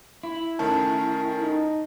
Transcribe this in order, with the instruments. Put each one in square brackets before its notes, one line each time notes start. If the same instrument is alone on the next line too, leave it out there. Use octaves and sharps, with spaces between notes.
[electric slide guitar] E4
[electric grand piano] D#3 A3 C#4 [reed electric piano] A5
[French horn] D#4